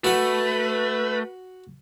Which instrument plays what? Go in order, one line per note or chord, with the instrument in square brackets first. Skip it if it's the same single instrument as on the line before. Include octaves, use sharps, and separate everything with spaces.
[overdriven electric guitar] A3 [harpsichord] F#4 F#5 [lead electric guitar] B4